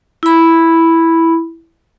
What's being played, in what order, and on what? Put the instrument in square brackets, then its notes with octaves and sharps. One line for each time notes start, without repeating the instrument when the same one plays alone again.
[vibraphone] E4 B5